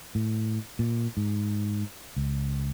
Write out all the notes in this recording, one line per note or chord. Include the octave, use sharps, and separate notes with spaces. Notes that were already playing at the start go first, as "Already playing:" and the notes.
A2
A#2
G#2
C#2